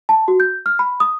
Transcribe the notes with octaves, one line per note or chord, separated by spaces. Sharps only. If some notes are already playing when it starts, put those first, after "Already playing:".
A5
F#4
G6
F6
B5
D#6